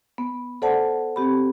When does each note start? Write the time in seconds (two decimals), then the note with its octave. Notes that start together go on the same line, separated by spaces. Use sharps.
0.18 B3
0.62 A4 C5 D5 F#5 A5
1.16 C4 G4 B5